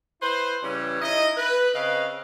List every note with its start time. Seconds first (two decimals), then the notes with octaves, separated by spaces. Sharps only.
0.21 E4 B4 C5
0.63 C#3 E3 G3 C#4
1.01 D#4 E4 D#5
1.37 B4
1.74 C#3 C4 B4 D#5 F5